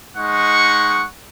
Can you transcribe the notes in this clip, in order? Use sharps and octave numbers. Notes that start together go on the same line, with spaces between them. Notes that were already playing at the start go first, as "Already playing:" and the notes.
G#3 D#4 F#5 C#6